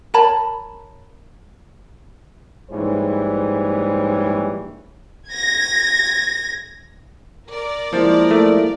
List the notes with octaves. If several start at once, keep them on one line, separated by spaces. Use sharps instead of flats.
A#4 C#5 A5 B5
A#1 G#2 E3 G3 G#4 C#5
G#6 A#6
A#4 D5
F3 G#3 A#3 E4
A3